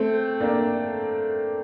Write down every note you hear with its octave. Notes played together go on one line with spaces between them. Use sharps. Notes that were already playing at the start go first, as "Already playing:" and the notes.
Already playing: A3 C4
A#3 D4